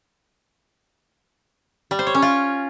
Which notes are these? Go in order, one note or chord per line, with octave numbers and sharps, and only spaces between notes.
G3
C5
C#5
C#4
F4